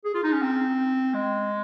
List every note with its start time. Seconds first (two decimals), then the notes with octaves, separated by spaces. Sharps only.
0.05 G#4
0.15 F4
0.23 D#4
0.33 C#4
0.42 C4
1.14 G#3